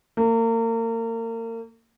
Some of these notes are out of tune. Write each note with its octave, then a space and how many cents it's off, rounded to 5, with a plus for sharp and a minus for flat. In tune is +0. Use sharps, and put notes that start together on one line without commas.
A#3 -35